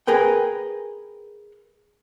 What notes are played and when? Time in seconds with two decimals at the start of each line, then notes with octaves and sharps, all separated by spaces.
0.07 G#4 A#4 B4 G5